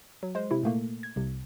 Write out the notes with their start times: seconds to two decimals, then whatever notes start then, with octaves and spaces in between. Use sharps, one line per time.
0.23 F#3
0.35 G#3 C5
0.51 C3 E4
0.64 A#2 A3 A#3
1.03 G#6
1.16 C2 C3